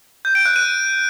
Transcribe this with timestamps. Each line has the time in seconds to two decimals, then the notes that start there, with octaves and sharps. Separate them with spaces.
0.25 G6
0.35 D7
0.45 F#6
0.56 D#7